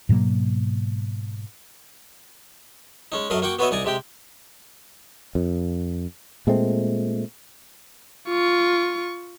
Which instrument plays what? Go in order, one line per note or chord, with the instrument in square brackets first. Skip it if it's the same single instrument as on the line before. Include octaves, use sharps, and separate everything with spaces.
[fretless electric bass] G#2 B2 F#3 A#3
[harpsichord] G#3 C#4 D#4
F#2 F#3 A3 A#4 D#5 F5
A#3 F#4 F#5 G5 C#6 D6
B3 F#4 B4 C#5 D#5 E5
C2 D#4 D5 G#5 A#5
C3 G#3 G4 G5
[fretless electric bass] F2
A#2 G#3 A3 C4
[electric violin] F4 C#6